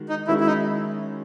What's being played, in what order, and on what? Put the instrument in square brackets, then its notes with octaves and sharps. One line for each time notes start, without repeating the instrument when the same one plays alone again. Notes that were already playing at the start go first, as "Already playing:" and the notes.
Already playing: [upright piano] D#3 G#3 F#4
[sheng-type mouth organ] D#4
[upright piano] D#3 G#3 C#4 F#4 [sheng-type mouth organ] E4
[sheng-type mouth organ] E4
D#4